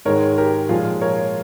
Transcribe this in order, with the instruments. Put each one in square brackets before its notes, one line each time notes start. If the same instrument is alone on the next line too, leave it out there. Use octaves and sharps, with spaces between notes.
[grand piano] G#2 D#3 G#3 A#4 C#5
G4 A#4
A#2 F3 G#3 F4 G#4
A#4 C#5